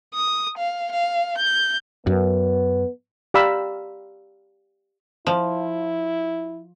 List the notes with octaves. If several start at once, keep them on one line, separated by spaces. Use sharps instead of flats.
D#6
F5
F5
G6
F#2 B3
G4 D5 F5 A#5 B5 E6
F3 E4